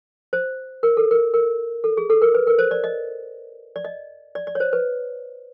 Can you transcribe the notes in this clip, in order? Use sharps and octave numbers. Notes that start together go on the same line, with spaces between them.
C5
A#4
A4
A#4
A#4
A4
G#4
A4
A#4
B4
A#4
C5
D5
D#5
D5
D#5
D5
D5
C#5
C5
B4